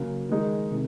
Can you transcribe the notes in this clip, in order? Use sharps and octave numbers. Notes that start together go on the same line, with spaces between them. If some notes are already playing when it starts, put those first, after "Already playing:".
Already playing: C#3 F#3 A#3
D#3 G#3 D#4 G#4
C3 D#3